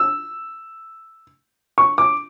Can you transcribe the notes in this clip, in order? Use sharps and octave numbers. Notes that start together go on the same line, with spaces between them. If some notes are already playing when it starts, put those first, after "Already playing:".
Already playing: E6
C#6
D6